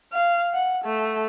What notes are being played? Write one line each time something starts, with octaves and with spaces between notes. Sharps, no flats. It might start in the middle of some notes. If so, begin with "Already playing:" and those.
F5
F#5
A3